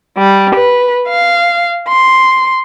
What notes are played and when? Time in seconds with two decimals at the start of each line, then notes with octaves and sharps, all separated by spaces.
0.17 G3
0.54 B4
1.08 F5
1.88 C6